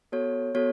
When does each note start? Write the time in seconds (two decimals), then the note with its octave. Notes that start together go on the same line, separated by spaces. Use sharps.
0.12 B3 F#4 A4 C#5
0.55 B3 F#4 A4 C#5